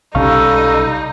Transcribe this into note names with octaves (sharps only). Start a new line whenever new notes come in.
B1 C3 G3 C#4 D#4 A4 F5 C#6